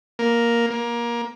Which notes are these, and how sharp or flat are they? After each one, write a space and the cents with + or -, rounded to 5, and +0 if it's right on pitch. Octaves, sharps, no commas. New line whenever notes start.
A#3 +5
A#3 +20